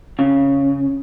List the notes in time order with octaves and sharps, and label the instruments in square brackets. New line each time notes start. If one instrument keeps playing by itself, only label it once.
[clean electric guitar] C#3